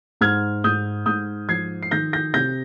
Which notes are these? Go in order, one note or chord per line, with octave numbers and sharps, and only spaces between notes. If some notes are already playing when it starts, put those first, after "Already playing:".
G#2 F6 G#6
G#2 D#6 G6
G#2 D#6 G6
F3 G#6 C7
C7
D#3 G6 A#6
G6 A#6
C3 G6 A#6